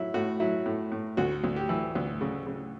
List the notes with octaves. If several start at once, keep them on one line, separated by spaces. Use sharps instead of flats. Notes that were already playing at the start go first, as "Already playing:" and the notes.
Already playing: F#3 E4
A2 F#4
F#3 E4
A2
A2
D2 F#4
D2
G4
E3
D2
C#3
C#3